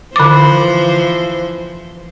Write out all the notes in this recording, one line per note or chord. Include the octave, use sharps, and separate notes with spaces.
D3 E3 F3 C5 D6